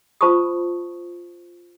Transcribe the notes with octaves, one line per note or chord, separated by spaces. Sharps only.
F4 C5 A5 B5 C#6 D#6